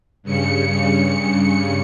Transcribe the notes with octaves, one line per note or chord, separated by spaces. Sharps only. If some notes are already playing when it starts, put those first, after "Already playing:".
G2 C#3 C#7